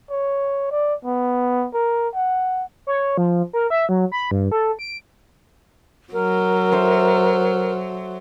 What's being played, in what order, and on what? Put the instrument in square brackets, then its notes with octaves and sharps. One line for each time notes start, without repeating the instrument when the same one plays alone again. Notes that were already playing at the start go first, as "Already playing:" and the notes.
[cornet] C#5
D5
B3
A#4
F#5
[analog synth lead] C#5
F3
A#4
E5
F#3
B5
G2
A4
D7
[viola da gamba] F#3 [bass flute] A#4
[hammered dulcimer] A4 C5 E5